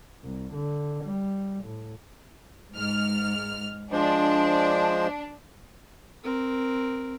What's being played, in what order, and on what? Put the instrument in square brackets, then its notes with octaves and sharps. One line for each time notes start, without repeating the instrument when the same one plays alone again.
[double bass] C2
D3
G3
A2
[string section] G#2 F6
[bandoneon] F3 G#3 C5 [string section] D4
[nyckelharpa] C4 A#4